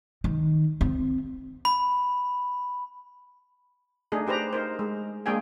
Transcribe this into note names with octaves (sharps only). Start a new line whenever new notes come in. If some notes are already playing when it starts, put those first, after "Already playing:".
D#3
C4
B5
A3 D4 D#4 G#4
D4 G4 B4 C5 A#5
D#4 A#4 C5
G#3
G#3 A#3 D4 G#4 G5 G#5